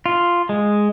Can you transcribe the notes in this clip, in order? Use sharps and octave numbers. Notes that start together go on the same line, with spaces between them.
F4
G#3